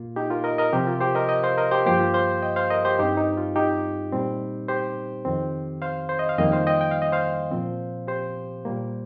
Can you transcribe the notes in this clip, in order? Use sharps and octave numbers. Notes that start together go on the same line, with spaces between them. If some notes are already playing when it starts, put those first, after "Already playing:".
Already playing: A#2 A#3 F4
D#4 G4
F4 A#4
A#4 D#5
A#4 D#5
C3 F3 C4 G4 C5
F4 A#4
G4 C5
A#4 D#5
D#5 G5
C5 F5
A#4 D#5
G4 C5
G2 F3 A#3 G4 C5
F4
C5 F5
D#5 G5
C5 F5
A#4 D#5
G4 C5
G2 G3 C4 D#4 G4
D#4
F4
D#4 G4
A#2 G3 C4
G4 C5
F2 D#3 C4
C5 F5
C5
D#5
F5
F2 D#3 G3 A#3 D#5 G5
C5 F5
D#5 G5
G5
F5
D#5
C5 F5
A#2 F3 C4
G4 C5
A#2 G3 A#3